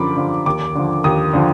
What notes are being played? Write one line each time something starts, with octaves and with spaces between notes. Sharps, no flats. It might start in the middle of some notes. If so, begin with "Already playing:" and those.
Already playing: F#2 D3 F3 B5 D6
D3 F3
D#2 D6
D3 F3
D#2 D#6
D3 F3